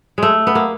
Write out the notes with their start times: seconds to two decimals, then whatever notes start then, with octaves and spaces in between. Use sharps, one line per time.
0.18 G#3 A3
0.47 B3
0.55 A#3